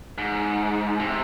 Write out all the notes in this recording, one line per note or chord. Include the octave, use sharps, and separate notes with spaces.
G#2
C3